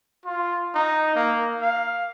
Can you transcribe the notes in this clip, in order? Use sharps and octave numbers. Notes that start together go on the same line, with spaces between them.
F4
D#4
A#3
F5